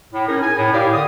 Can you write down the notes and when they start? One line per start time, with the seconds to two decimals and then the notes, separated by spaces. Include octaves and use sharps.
0.12 A2
0.27 C#4 D#4 E4 G#4 A#4
0.41 G#5
0.57 A2
0.72 G4 G#4 A#4 D5 F5 G5
0.92 D3 D#6